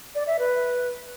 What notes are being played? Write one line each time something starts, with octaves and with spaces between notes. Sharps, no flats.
D5
E5
B4